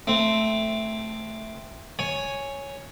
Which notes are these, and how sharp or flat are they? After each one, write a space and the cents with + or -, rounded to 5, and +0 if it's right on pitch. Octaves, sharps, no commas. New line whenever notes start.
A3 +0 C4 +0
C#5 +0 G#5 +0